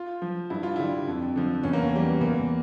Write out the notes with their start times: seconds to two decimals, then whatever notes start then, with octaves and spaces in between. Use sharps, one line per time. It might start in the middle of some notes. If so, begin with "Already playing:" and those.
Already playing: F4
0.22 F3
0.50 G2 E4
0.63 F4
0.76 D3 G3 E4
1.07 F2
1.36 D3 F3
1.63 E2 C#4
1.73 A#3
1.82 C#4
1.93 E3 G3
2.21 E2 A#3